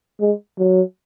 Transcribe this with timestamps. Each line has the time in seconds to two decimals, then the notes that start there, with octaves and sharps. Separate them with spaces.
0.21 G#3
0.59 F#3